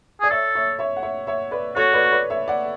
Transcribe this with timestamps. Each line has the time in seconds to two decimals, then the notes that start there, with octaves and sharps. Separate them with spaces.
0.21 G#4 D5
0.30 A4 C#5 E5
0.55 C#5 E5
0.79 C#5 E5
0.97 F#5
1.03 C#5 E5
1.27 C#5 E5
1.51 B4 D5
1.76 F#4 A4 C#5
1.93 B4 D5
2.05 C#5
2.12 B4 D5
2.30 C#5 E5
2.48 D5 F#5